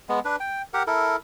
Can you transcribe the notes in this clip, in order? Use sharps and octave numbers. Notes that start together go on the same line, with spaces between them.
G#3 B3
D4 B4
G5
G4 A#4 F#5
E4 A4 A#4